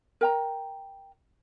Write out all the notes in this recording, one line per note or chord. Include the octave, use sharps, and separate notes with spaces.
A#4 G5 A#5